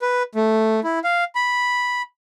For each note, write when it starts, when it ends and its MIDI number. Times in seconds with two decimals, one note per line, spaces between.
0.02 0.23 71
0.35 0.80 57
0.84 0.99 64
1.04 1.24 77
1.35 2.02 83